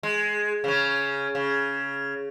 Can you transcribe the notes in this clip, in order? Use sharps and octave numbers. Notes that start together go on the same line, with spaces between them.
G#3
C#3 C#4
C#3